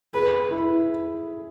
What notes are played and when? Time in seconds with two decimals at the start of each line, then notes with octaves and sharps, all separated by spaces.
0.14 G#4 B4
0.51 E4